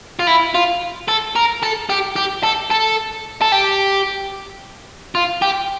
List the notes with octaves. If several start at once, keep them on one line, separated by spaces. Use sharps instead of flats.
F4
E4
F4
A4
A#4
A4
G4
G4
A4
A4
A4
G4
F4
G4